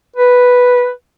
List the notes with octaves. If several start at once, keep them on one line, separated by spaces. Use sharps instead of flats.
B4